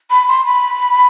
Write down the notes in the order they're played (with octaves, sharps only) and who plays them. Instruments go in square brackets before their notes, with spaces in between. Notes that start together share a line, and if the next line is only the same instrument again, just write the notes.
[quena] B5
C6
B5